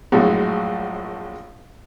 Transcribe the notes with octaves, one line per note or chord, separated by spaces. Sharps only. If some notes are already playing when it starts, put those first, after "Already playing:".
A#1 F#2 A2 G#3 F#4